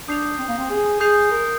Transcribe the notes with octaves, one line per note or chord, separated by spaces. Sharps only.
D4 D#6 G6 C7 F7
C4
A#3
C4
G#4
G#4 D#6 G6 C7 F7
A#4